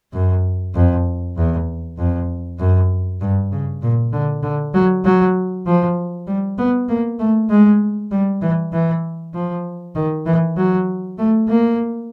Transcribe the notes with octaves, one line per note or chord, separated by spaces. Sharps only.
F#2
F2
E2
F2
F#2
G2
C#3
A#2
D3
D3
F#3
F#3
F3
G3
B3
A#3
A3
G#3
G3
E3
E3
F3
D#3
E3
F#3
A3
A#3